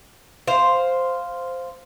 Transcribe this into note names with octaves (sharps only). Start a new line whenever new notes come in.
C5 F5